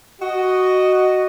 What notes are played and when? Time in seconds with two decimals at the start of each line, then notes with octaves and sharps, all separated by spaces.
0.22 F#4 D#5